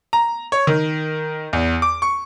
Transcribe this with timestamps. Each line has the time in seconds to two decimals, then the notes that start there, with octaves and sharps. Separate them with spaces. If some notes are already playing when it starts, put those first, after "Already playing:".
0.13 A#5
0.52 C#5
0.67 D#3
1.53 E2
1.82 D6
2.02 C#6